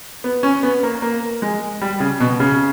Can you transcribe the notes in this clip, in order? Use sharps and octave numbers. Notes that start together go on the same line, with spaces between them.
B3
C#4
B3
A#3
A#3
G#3
G3
C#3
B2
C#3